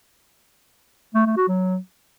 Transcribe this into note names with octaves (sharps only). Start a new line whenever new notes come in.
A3
A3
F#4
F#3